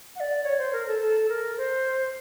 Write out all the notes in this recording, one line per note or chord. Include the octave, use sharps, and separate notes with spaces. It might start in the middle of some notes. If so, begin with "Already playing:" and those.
F#5
D5
C#5
C5
A#4
A4
A4
A#4
C5